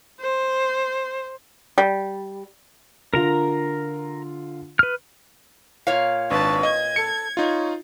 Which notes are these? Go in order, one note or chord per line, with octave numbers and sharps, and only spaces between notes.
C5
G3
D3 F4 A#4 A#5
B4 F6
A#2 C#5 F5
G#1 D4 B4 A5 C#6
D#5 G#6
A4 C#7
D#4 F4 C#5